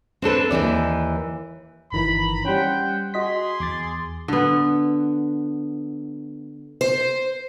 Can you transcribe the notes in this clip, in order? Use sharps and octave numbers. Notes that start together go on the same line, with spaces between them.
C4 D4 A4 B4
D#2 C3 E3 D5
G1 D#3 E3 A#5 B5
G3 C#4 C5 F#5 G5
F#4 G#4 D#5 C6 B6
E2 D6 A6
D3 B3
C5